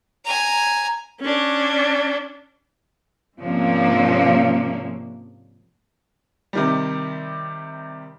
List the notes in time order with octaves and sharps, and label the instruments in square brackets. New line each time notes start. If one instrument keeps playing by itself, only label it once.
[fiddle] G#5 A#5
[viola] C#4 D4
[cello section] G#2 C3 F3 A#3 C#4 D4
[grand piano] C3 D#3 G3